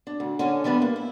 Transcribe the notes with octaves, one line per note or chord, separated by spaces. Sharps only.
D4
D2
D3 C#4 G#5
E3 G3 B3 D4 B4
A#3
E4